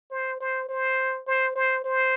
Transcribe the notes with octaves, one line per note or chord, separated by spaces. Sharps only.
C5
C5
C5
C5
C5
C5